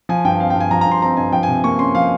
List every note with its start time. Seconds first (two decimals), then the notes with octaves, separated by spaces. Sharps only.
0.09 F3 G#5
0.25 G2 G5
0.40 C4 F5
0.50 G5
0.55 G2 G#5
0.71 F3 A#5
0.81 A#5
0.87 G2 C6
1.02 C4 A#5
1.17 G2 G#5
1.32 F3 G5
1.43 G#5
1.48 C3
1.64 A#3 C#6
1.79 C#4 C6
1.95 F3 F5